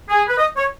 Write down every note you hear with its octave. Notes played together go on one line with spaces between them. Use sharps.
G#4
B4
D#5
C#5